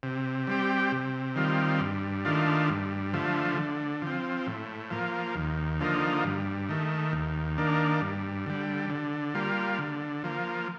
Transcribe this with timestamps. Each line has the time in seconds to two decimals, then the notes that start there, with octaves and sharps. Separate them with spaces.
0.03 C3
0.47 G3 C4 G4
0.92 C3
1.36 D#3 G3 C4 F4
1.80 G2
2.25 D#3 A3 D4 F4
2.70 G2
3.14 D3 F3 A3
3.58 D3
4.02 F3 C4
4.47 A2
4.91 F3 A#3
5.36 D#2
5.80 D3 F3 A#3 D#4
6.24 G2
6.69 D#3 A3
7.13 D#2
7.58 D#3 A#3 D4
8.01 G2
8.46 D3 G3
8.90 D3
9.35 G3 A#3 F4
9.79 D3
10.24 F3 A#3